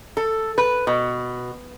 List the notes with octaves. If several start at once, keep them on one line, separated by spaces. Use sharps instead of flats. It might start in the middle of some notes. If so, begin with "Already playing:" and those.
A4
B4
B2